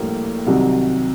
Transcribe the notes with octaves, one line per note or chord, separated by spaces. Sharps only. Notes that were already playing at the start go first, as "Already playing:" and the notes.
Already playing: A#1 A2 G3 A#3
C2 C3 D#3 F#3